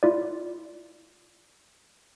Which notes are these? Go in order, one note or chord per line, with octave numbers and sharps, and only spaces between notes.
E4 F4 D5